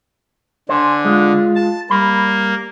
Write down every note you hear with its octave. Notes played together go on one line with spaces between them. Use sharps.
D3 C5 G#5
G#3 F4
A5
G3 A#3 B5